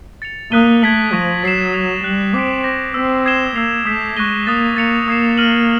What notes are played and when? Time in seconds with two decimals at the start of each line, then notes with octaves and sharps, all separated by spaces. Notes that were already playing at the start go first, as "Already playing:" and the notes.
0.22 A6 C#7 F7
0.52 A#3 D#6 F#6 B6 D#7 G7
0.82 A3 G#6 B6 D7 F#7
1.13 F3 C#6 F#6 A#6 D#7
1.43 F#3 A6 C7 E7
1.74 G#6 C7 F7
2.04 G3 F#6 A#6 C#7 F#7
2.34 C4 D6 F#6 B6 D7
2.64 D6 G6 A#6
2.94 C4 E6 G6 B6
3.25 D#6 G#6 C7 E7 G7
3.56 A#3 E6 G6 C7 F7
3.85 A3 D#6 G6 B6
4.16 G#3 C#6 F#6 A#6 D#7 G7
4.47 A#3 D#6 F#6 A6
4.76 A#3 A6 C#7 F7
5.07 A#3 D#6 G#6 C7 E7
5.38 F6 A#6 D#7 F#7